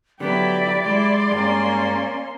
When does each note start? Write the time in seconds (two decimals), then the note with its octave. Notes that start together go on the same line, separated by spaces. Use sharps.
0.20 D3 F#3 B3 E4 G4 D5 B5
0.86 G#3 E4 C6
1.31 G2 G#3 A#3 C#4